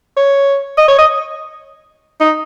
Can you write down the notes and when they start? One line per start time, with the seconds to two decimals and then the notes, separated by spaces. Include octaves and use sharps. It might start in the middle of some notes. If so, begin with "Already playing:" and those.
0.17 C#5
0.78 D#5
0.88 C#5
0.99 D#5
2.21 D#4